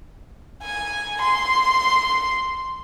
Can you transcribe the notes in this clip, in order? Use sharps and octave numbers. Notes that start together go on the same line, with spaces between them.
G#5
C6